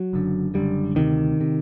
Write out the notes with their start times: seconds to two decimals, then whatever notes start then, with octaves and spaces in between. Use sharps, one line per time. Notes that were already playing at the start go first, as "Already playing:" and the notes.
Already playing: F#3
0.13 F#1 F#2 D3
0.54 F#1 F#2 D3 G3
0.95 D2 C3 D#3
1.41 C3